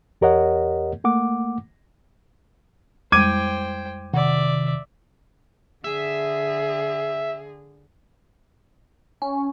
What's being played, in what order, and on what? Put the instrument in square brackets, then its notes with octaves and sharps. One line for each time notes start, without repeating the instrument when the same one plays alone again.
[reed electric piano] E2 G4 A#4 C#5 D#5 F#5
A3 A#3 F#5 D6
[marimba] F2 G3 G#3 [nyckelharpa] C5 G5 [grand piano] D6 G#6 D#7
[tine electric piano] C3 D#3 [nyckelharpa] D5 E5 [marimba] F#5
[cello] D3 G#4 [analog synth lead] E5
[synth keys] C#4